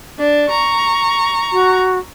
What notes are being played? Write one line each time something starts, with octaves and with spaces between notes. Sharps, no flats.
D4
A#5 C#6
F#4